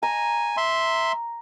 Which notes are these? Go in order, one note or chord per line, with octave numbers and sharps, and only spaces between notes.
G#5 A#5
E5 C6